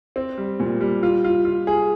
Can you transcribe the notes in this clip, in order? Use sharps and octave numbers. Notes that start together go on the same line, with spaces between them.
C4
G3
A#2
G3
F4
F4
F4
G#4